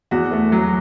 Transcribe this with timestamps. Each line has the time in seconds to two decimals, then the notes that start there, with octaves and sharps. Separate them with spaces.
0.11 E2 F#4
0.31 A3
0.52 F#3